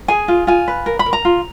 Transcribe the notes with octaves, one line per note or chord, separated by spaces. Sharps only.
G#4 G#5
F4
F4 G#5
B4
A#4
B5
A#4
A#5
F4